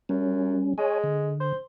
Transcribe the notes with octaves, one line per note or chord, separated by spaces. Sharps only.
F#2 G3 C#4
G#3 C#5 G#5
D3
C5